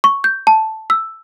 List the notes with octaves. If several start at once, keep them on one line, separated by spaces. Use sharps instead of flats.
C#6
G6
A5
E6